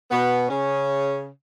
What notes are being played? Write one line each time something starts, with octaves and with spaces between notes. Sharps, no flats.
B2 B3
C#3 C#4